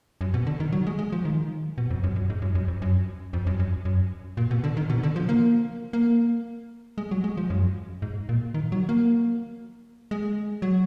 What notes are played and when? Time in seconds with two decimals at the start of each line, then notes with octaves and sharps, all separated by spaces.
0.21 F#2
0.34 B2
0.47 D3
0.60 D#3
0.72 F#3
0.87 G#3
0.99 G#3
1.12 F3
1.25 D#3
1.78 B2
1.90 F2
2.04 F#2
2.16 F#2
2.30 G#2
2.42 F#2
2.55 F#2
2.68 F2
2.82 F#2
3.33 F2
3.47 F#2
3.59 F#2
3.85 F#2
4.37 A#2
4.51 B2
4.64 D3
4.77 D#3
4.89 B2
5.03 D3
5.16 F3
5.29 A#3
5.93 A#3
6.98 G#3
7.11 F#3
7.24 G#3
7.37 F3
7.50 F#2
8.02 G#2
8.29 A#2
8.54 D#3
8.72 F#3
8.89 A#3
10.11 G#3
10.62 F#3